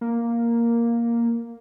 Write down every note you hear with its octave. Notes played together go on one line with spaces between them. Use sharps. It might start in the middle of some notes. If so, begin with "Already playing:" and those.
A#3